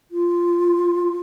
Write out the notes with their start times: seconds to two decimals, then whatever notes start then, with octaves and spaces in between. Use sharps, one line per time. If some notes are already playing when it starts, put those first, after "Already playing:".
0.11 F4